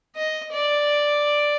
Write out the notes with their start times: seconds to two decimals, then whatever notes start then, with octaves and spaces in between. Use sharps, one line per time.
0.15 D#5
0.52 D5